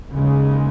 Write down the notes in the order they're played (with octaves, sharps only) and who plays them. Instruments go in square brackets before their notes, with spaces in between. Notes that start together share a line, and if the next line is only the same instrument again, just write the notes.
[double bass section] D#2 C#3 G#3